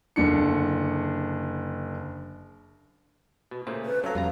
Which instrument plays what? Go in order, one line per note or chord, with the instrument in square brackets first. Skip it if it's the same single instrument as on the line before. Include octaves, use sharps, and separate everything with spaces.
[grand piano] F#1 D3 D4 C#7
[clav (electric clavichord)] B2
[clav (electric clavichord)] A#2 C#3 A3 [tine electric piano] C5
[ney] B4
[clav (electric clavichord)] F#3 [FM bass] C#4 [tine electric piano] A4 A#5 [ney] F5
[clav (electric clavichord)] G1 B2 A#5 [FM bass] F2 [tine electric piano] G3